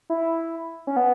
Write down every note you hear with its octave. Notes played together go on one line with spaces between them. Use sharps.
E4
C#4
B3